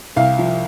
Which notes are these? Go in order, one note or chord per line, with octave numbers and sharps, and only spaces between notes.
C2 F5
F3